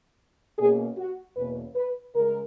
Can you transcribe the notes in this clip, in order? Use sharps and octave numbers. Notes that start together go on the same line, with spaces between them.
B2 A#3 C#4 G#4
F#4
E2 B2 A#3 C#4 B4
B4
C#3 G#3 A#4